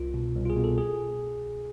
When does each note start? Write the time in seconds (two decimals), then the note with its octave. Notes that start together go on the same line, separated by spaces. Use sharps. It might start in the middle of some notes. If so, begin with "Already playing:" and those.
Already playing: C2 F4
0.14 B2
0.36 C2
0.45 F4
0.50 G#4
0.56 B2
0.64 A4
0.78 G#4